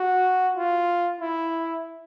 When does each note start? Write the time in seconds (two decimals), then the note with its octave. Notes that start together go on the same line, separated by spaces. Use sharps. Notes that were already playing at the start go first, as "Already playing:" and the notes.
Already playing: F#4
0.57 F4
1.21 E4